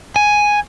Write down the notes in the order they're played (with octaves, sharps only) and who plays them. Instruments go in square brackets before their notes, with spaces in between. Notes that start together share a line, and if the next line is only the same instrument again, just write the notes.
[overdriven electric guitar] G#5